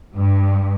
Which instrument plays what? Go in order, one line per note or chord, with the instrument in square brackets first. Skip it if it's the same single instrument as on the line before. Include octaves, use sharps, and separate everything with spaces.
[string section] G2